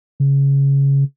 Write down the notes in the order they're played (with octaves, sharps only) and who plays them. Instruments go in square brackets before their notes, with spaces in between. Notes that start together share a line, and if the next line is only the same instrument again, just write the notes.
[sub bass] C#3